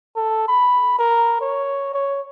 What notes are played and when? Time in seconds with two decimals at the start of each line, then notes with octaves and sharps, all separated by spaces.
0.16 A4
0.48 B5
0.99 A#4
1.41 C#5
1.94 C#5